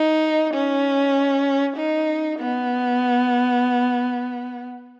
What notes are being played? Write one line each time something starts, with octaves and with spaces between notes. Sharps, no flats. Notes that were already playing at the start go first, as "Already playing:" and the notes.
Already playing: D#4
C#4
D#4
B3